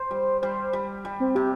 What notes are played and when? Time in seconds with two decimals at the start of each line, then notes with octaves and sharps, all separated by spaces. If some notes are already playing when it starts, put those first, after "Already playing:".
Already playing: C5
0.11 G3
0.41 G3 C5
0.73 G3
1.05 G3
1.20 C4
1.35 C3 G4